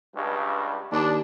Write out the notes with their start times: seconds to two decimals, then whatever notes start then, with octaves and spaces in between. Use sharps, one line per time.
0.15 C#2 G2
0.92 D#2 D4